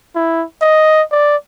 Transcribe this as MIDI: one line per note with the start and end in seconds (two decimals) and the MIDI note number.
0.15 0.44 64
0.62 1.02 75
1.12 1.36 74